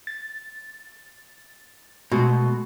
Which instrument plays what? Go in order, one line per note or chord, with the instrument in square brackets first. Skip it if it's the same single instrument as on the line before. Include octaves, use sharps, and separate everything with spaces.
[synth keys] A6
[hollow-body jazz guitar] B2 [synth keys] G#3 A3 F#4